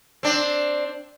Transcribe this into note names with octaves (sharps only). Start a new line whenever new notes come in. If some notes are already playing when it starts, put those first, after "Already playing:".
C4 D4